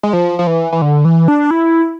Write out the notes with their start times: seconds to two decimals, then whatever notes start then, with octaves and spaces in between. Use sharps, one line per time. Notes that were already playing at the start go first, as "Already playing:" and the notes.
0.03 G#3
0.13 F3
0.39 F3
0.47 E3
0.73 E3
0.82 D3
1.05 E3
1.28 D4
1.51 E4